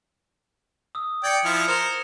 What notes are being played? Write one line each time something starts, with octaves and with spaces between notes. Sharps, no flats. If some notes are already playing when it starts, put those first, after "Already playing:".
D#6 E6
D5 G5 G#6 A6 C#7
F3 E4 F6
A#4 C5 C#7 E7 F7